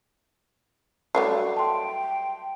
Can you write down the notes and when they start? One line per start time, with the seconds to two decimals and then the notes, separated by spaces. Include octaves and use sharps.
1.15 F#3 G3 A3 C7
1.57 G5 A5 C6